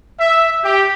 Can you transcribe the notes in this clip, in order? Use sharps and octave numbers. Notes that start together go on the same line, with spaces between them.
E5
G4